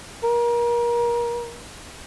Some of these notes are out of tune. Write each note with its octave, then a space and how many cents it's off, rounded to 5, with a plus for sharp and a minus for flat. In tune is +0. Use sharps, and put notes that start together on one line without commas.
A#4 +30